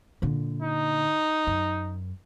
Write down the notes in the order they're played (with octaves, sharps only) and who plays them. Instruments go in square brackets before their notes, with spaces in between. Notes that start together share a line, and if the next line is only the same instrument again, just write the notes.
[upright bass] A#2 D3
[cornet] D#4
[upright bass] F#2